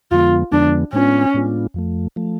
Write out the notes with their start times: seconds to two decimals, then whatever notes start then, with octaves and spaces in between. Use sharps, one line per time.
0.11 F2 D3 F3 G#3 B3 F4
0.51 F2 D3 F3 G#3 B3 D4
0.93 A2 G#3 B3 C#4 D4 F4
1.34 A2 G#3 B3 D4 F4
1.74 F2 F3 A3
2.16 F3 A3